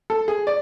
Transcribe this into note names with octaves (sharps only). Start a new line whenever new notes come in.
A4
G#4
D5